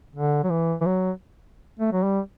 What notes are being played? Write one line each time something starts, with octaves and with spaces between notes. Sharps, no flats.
D3
F#3
E3
E3
F#3
A3
F#3
G3